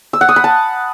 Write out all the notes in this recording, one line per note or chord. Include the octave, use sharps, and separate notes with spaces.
E6
F#5
D#6
B5
A5